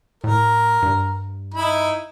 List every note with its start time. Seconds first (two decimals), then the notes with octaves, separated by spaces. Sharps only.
0.24 A2 A#4
0.82 G2
1.54 D#4 E4 B5